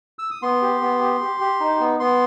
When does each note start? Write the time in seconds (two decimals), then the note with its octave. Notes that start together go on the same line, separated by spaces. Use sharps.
0.19 E6
0.31 D#6
0.42 B3 C6
0.62 G4
0.82 B3
1.01 G4
1.21 G4
1.41 G4
1.60 D#4
1.80 B3
2.00 B3 C6